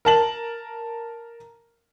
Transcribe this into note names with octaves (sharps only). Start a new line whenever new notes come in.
A#4 A5 F#7